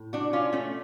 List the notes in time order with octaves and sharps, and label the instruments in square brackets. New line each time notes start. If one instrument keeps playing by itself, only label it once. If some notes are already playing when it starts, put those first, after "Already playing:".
Already playing: [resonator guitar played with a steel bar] A2
D4 F#4
C#4 F4
A3 C#4